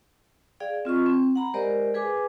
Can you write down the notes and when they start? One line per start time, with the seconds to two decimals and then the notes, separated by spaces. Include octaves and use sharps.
0.60 G#4 D5 F5 G5
0.85 C4 F4 D#5 C#6
1.06 C4
1.35 F#5 A#5 B5
1.54 G#3 G4 A#4 C5 D5 D#5
1.94 G#4 B4 G#5 D6